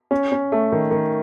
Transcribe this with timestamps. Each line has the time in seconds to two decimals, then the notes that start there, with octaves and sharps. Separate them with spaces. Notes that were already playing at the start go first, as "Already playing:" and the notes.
0.11 C#4
0.32 C#4
0.52 A3
0.72 D#3
0.91 D#3